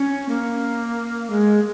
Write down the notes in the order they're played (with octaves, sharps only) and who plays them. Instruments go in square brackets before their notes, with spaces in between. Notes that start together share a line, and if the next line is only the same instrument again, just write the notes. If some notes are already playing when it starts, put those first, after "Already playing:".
Already playing: [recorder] C#4
A#3
G#3